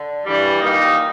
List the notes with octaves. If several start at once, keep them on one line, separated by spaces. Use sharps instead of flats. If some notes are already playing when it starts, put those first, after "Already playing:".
Already playing: D3
G2 E3 G3
A#2 G3 A#3 D#4